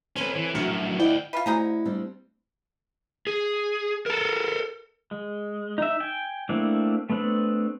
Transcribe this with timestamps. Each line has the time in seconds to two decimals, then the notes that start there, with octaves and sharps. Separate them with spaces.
0.16 C4 C#4 A4 B4 C#5 G#5
0.35 E3
0.55 A#1 F#2 A2 F#4 F6 C#7
1.00 D2 E4 D5 D#5 F#5 G5
1.33 F4 B4 E5 F6
1.46 A3 D#4 E4 F#4 G#4 C5 D5 A#5
1.85 G3 C4 D4
3.27 G#4
4.06 A4 A#4
5.11 G#3
5.78 D#4 E5
6.00 G5 G#5
6.49 A3 A#3 C4 D4 E4
7.10 A3 B3 C4 D4